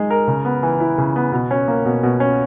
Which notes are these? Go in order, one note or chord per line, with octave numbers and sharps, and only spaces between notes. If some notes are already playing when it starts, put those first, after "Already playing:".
Already playing: G#3 D#4 D#5
A#4
C#3
B3
E3
E4
C#3
B3
B2
C#4
A#3
B2
B2
C#4